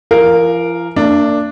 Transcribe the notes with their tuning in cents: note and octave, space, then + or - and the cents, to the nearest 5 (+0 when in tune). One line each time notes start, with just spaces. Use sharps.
F3 -45 A#4 +0 F5 +0
A#3 -35 D4 +0 E5 +40